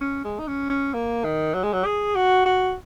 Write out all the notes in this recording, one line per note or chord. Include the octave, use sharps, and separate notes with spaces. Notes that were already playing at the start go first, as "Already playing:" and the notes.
C#4
G#3
D#4
C#4
C#4
A#3
D#3
F#3
G#3
F#3
G#4
F#4
F#4